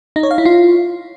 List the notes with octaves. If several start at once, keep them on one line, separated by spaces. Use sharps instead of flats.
D#4
C#5
F5
E4
F4